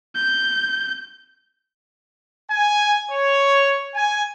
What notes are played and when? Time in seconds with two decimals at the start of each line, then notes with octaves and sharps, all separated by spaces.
0.16 G6
2.50 G#5
3.11 C#5
3.95 G#5